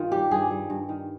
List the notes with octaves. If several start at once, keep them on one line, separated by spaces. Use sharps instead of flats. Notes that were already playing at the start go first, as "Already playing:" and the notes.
Already playing: G2 D#3 F4
G3 G4
G2 G#4
G3
G2
D#3